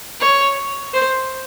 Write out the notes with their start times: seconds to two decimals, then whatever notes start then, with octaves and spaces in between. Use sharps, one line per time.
0.21 C#5
0.94 C5